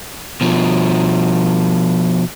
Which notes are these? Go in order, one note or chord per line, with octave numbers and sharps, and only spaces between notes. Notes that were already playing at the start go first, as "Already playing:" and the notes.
B2 F3